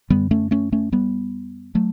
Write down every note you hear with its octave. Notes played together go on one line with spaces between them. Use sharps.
F#2 D3 G3 B3
A3 C#4
A3 C#4
A3 C#4
G3 B3
F#3 A3